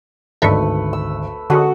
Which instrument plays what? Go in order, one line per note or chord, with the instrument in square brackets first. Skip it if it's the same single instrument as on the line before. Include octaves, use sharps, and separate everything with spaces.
[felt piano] G#1 D2 C#7 [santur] A3 B4 [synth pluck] D4 D#4 E5
[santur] E6
[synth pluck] D3 G#3 C#4 [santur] F#4 A4 F#5 [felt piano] D#6